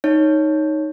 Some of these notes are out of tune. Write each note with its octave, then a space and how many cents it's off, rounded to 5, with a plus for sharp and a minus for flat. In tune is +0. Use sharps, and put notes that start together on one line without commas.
D#4 +0 C#5 +0